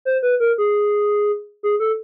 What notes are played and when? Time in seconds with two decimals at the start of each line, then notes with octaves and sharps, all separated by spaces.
0.05 C5
0.23 B4
0.40 A#4
0.58 G#4
1.63 G#4
1.80 A4